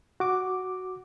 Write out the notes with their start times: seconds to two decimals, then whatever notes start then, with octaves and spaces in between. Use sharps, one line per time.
0.20 F#4 D6